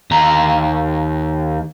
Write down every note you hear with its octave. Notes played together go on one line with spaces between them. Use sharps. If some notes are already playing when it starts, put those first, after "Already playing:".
D#2 A#5